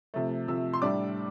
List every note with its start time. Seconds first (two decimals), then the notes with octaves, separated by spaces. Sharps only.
0.14 C3 F3 A3
0.48 C3 F3 A3 E6
0.73 C6
0.81 A2 G3 D4 D6